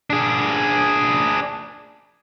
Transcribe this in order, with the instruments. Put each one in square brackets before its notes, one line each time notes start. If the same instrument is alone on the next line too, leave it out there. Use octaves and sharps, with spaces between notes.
[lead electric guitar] D4 G#4